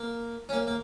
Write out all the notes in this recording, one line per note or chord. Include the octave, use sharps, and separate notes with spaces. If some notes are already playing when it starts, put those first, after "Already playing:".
Already playing: A#3
C#4
A#3
A#3